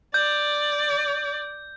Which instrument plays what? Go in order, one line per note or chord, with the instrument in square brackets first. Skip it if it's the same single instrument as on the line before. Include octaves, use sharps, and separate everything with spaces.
[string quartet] D5 [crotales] G6